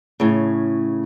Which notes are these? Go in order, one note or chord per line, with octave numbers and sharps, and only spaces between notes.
A2 C#3